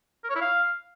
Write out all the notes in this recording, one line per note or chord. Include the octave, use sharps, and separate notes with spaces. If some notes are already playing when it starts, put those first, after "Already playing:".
A#4
C#5
E4
F5